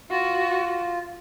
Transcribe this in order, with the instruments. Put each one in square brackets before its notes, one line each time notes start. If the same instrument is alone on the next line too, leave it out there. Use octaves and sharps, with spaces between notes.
[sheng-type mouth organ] F4 [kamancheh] F#4